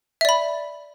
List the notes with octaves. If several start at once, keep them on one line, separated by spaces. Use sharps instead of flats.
D5 E5 B5